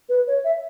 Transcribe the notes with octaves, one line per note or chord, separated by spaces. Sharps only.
B4
C#5
E5